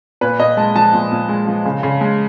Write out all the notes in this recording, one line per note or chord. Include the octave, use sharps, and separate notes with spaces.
A#2 B4
A#2 D#5
G#3 A5
F3 A5
A#2
A#2
G#3
F3
C#3
C#3
G#3